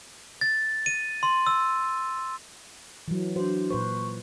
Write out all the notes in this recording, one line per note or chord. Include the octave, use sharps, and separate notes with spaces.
A6
D#7
C6
E6
E3 F#3
D4 F#4 C5
A#2 B4 C5 C#6